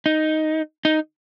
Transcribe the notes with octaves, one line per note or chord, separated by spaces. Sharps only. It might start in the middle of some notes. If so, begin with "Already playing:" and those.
D#4
D#4